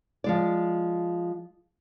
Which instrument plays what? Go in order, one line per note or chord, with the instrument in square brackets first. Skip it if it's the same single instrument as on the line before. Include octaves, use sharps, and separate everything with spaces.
[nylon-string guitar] F3 G#3 D5